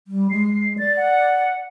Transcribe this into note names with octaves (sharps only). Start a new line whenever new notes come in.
G3
G#3 C7
D5 A6
F#5